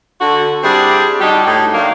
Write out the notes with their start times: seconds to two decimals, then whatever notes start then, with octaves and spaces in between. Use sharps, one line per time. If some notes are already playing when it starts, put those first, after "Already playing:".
0.21 D3 F#4
0.63 G3 C4 D4 E4 G4 G#4
1.20 A2 G3 D4 D#4 F#4 G4
1.47 A2 D#4
1.74 D#3 F#3 A3 A#3 D4